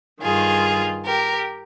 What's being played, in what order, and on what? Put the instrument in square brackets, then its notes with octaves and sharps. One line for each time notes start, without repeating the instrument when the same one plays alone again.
[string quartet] G2 D#3 F4 G#4
G4 A#4